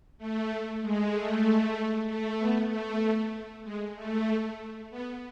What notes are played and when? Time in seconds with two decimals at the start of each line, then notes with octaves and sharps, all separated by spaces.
0.18 A3
0.81 G#3
1.13 A3
2.07 A3
2.38 B3
2.70 A3
3.64 G#3
3.96 A3
4.90 B3